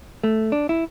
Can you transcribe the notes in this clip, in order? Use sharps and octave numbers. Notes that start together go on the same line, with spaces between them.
A3
D4
E4